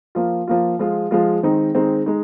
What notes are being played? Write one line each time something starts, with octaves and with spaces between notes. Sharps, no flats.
F3 A#3 F4
F3 A#3 F4
F3 G#3 F4
F3 G#3 F4
D#3 G#3 C4 D#4
D#3 G#3 C4 D#4
G#3 D#4